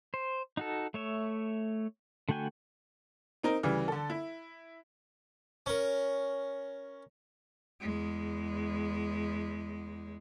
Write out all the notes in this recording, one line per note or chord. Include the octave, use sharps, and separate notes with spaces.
C5
D#4 F#4 A4
A3 C#5 E5
D3 A3 F#4 G5 G#5
C4 D#4 A#4
D2 C#3 E3 G3
D3 A4
E4
C#4 A#4
E2 G#3